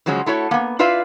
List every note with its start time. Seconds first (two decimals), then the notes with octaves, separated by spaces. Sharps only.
0.06 C#3 F3 F#3 G#3 C#4
0.26 A3 E4 F#4 C#5
0.51 A#3 B3
0.79 E4 F4 B4 D5 E5 F5